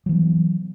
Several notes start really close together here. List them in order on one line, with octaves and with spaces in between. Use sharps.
F#3 E3 B3